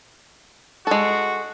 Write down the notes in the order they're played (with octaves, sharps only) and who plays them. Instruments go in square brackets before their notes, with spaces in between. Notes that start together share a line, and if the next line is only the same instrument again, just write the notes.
[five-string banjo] G#3 A4 [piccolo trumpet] F#4